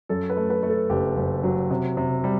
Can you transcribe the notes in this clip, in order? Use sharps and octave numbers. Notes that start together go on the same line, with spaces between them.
F#2 A4
B4
A3
B4
A3
A4
F#1 G4
F#1
F#3
C3
C3
G3